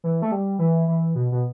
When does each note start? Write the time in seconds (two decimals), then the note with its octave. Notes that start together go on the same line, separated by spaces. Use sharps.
0.04 E3
0.22 A3
0.31 G3
0.59 E3
0.88 E3
1.15 B2
1.32 B2